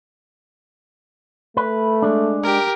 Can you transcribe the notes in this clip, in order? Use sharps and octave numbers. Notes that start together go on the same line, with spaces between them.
A3 B4
G#3 D4
G4 A#4